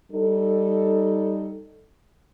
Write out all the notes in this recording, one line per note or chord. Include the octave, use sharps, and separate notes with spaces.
G3 D#4 A4